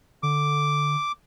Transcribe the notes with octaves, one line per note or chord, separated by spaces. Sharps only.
D3 D6